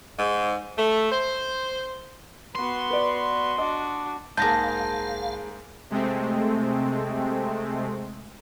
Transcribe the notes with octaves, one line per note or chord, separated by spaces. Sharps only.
G#2
A3
C5
B3 F#4 C6
B4 D5
D4 F#4 D#5
B1 G#2 A#3 G#4 F5 A5 G6 A#6
C3 G#3 A3 C4